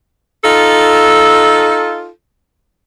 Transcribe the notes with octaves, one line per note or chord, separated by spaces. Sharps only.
D#4 F4 A4